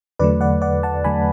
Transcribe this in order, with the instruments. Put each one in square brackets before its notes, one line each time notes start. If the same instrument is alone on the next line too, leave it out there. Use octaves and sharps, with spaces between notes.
[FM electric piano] E2 D3 F#3 A3 B4 D5
D5 F#5
D5 F#5
F#5 A5
E2 D3 F#3 A3 G#5 B5